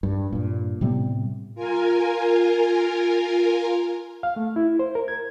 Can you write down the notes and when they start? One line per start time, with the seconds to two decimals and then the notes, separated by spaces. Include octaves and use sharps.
0.03 G2
0.32 G2 A#2
0.81 A2 C3 G3 B3
1.55 F4 A#4 G#5
4.23 F5
4.36 A3
4.56 E4
4.79 C5
4.95 A#4
5.08 G#6